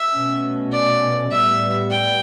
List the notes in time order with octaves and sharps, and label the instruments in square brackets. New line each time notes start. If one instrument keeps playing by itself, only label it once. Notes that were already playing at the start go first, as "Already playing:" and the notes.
Already playing: [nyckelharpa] E5
[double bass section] B2 A3 C#4
[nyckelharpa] D5
[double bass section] A2 G3 B3 [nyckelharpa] E5
[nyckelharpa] G5